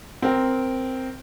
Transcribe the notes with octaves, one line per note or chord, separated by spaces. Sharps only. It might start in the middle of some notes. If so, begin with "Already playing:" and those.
C4 A#4